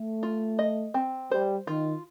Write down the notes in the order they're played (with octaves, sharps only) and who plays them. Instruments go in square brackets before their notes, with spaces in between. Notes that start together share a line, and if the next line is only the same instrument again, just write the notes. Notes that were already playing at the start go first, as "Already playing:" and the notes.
Already playing: [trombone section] A3
[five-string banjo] F4
D#5
C4
[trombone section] G3 [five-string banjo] C5
[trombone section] D#3 [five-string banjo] F4